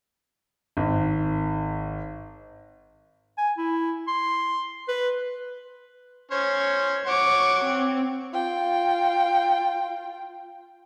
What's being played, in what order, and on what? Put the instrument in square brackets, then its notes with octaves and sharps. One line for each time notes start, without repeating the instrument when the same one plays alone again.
[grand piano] G#1
[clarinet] G#5
E4
C6
B4
[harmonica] C#4 C5 C#5
[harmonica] C#5 F#5 [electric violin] C#6 D6
[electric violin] C4
[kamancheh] F4 G5